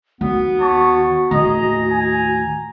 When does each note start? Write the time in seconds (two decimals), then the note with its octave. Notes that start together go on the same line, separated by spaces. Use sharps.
0.21 D#2 B3 F#4
0.60 C#5 A5 C#6
1.31 D#2 A2 G#4 D#5 A#5
1.89 G#5